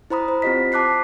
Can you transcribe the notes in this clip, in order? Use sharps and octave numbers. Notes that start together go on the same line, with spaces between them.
E4 C5 A#5 B5 D#6
C5
C4 F4 G4 D#5 B6
A5 D6 F#6 B6 C7